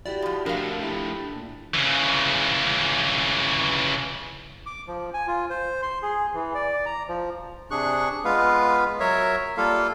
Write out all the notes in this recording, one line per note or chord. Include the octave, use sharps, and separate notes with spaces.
E4 F#4 G4 D5
A2 F3
F3 A3 D4 A#4 F5
E4 G4
A#2
C#3 E3
D6
F3
G#5
F4
C5
C6
G#4
E3
D5
A#5
F3
C3 D4 G#4 C#6 F#6
G#3 B3 F4 B4 F5
F#3 A#4 C#5 E5
G3 A#3 F4 A4 F5